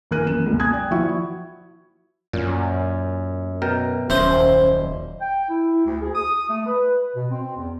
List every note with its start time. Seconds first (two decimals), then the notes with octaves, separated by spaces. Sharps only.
0.11 A#1 E3 A#4 F#6 D#7
0.26 F#2 E7
0.46 C#2 B2
0.59 G#5 D#6 F#6 G#6
0.73 D5 G5
0.91 F3 E4 F#4 E5 C#6
2.33 F#2 A#2
3.62 B2 A#4 G5
4.10 D#1 F#2 E4 C5
5.21 G5
5.49 E4
5.85 D2
6.01 G#4
6.14 D#6
6.49 A3
6.67 B4
7.14 B2
7.31 C4
7.56 E2